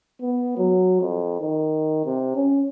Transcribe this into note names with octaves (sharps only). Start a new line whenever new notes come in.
B3
F#3
F2
D#3
C3
C#4